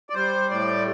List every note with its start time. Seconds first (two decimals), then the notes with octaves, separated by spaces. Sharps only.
0.10 D5
0.15 G3 C5
0.50 A2 D5